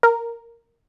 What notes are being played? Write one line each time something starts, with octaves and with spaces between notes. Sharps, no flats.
A#4